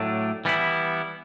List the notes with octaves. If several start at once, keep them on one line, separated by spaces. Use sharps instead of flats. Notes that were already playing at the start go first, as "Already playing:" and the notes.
Already playing: A2 F#3 A3 D4
E3 G3 B3 E4